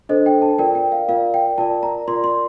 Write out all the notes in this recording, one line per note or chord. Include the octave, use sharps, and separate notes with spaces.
D4 A4 C5 D#5
G5
A5
F4 A#4 D5 G5
G5
F5
F4 A#4 D5 F5
G5
F4 A#4 D5 A5
A#5
F4 A#4 D5 C6
C6